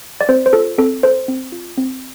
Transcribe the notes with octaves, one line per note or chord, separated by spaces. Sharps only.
D5
C4 C5
C5
F4 A4
C4 A4
A4 C5
C4
F4
C4